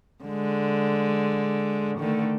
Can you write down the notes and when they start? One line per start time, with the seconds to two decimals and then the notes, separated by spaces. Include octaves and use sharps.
0.24 D3 G#3
1.98 D3 D#3 A3